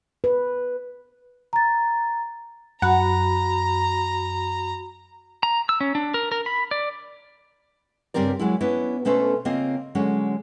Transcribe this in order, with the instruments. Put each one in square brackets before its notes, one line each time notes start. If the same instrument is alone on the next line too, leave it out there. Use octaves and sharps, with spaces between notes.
[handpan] B4
[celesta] A#5 A6
[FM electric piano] F#2 [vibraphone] F#4 B5 [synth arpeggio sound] F#5 [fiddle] A#5
[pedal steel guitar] A#5
E6
C#4
D4
A#4
A#4
B5
D5
[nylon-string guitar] G2 C#3 G3 C4 A#4 D5
F#3 G#3 E4
B3 C#4 D4 E4
B2 A3 C#4 A4 B4 C5
C#3 A#3 C4 F4 D#5
D3 F#3 G#3 C#4